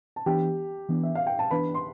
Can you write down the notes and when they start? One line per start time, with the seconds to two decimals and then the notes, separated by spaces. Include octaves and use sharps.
0.16 A5
0.26 E3 B3 D4 G4 G5
0.89 E3 B3 D4
1.03 E5
1.15 F5
1.27 G5
1.39 A5
1.51 E3 B3 D4 B4 B5
1.74 C6